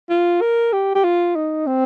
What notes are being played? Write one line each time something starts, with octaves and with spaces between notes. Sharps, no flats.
F4
A#4
G4
G4
F4
D#4
C4